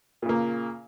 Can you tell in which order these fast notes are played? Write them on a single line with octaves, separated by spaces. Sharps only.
A#2 C#3 A#3